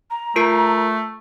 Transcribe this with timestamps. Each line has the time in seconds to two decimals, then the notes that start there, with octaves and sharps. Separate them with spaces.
0.11 A#5
0.36 A3 F4 A#4 C7